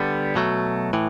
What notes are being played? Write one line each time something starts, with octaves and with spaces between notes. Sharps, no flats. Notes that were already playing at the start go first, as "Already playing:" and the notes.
Already playing: D3 G3 B3
B2 F#3 A3
A2 E3